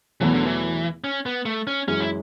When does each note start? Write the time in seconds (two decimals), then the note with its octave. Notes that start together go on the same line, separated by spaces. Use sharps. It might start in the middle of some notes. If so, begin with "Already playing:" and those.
0.21 E2 B2 E3 F#3 A3
0.34 D3
0.46 E3
1.04 C#4
1.26 B3
1.45 A3
1.67 C#4
1.88 F#2 E3 G#3 C#4
2.00 E4